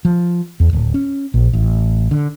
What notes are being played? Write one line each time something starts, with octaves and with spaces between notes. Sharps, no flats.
F3
E2
D1
C#4
A#1
A1
D3